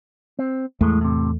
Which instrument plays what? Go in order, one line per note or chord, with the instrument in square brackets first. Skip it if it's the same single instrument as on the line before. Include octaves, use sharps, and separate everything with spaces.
[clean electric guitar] C4
[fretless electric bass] E2 A3 [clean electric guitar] A2 G#3
[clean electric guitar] A2 C3